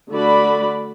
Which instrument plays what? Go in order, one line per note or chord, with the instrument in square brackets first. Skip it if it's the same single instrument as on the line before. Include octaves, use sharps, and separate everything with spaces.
[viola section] D3 A3 F#4 D5 B5